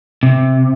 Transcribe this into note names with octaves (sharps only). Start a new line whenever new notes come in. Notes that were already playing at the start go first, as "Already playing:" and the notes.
C3